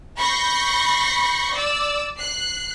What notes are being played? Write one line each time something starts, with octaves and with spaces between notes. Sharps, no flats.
B5 C#6 G6 A#6 C7
D5 E6
F#6 C7